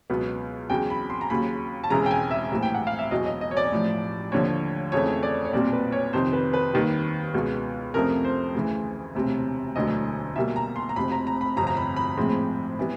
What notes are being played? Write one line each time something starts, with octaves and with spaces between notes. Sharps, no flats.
C#2 B2 F#3 B3
E2 C#3 F#3 G5
B5
C6
A#5
D#2 C#3 F#3 B5
A5
E1 E2 C#3 E3 G#3 A#5
G5
G#5
E5
A#1 A2 E3 G3
G5
F#5
F5
E5
E1 E2 B2 F#3 D#5
D#5
D#5
C#5
D5
A1 A2 F3
D#2 D3 F3 C#5
F2 C#3 E3 A3 C#5
D5
C#5
B1 A#2 G3 C4 D5
B4
C#5
F2 C3 D#3 C5
B4
B4
D#2 D#3 G3
C#2 B2 G#3
F2 C3 F3 A3 C#4 A#4
C5
D2 C#3 E3
E1 D2 C3
E1 D2 D3 F#3 D#5
B1 B2 G3 A#3 E5
A#5
C6
A#5
F1 F2 C3 B5
A#5
A#5
B5
G1 F2 C3 A#5
A#5
B5
B5
A#1 A2 F3 G#3 C4
E3 G3 B3